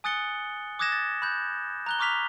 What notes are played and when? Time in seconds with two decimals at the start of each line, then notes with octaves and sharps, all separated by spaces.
0.04 G#5 D#6 F#6 A6 C#7 G7
0.79 D6 D#6 F#6 G#6 A#6 E7
0.92 A6
1.22 B5 F#6 G6
1.86 A#5 F#6 G7
1.99 A#5 C#6 D6 F6 B6 F7